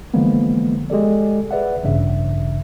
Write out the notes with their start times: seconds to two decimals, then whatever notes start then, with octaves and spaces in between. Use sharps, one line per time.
0.14 D3 E3 F3 G#3 A#3 B3
0.90 G#3 G4 A4 D5
1.51 G#4 B4 D5 E5 F#5
1.83 A1 G2 C#3 E5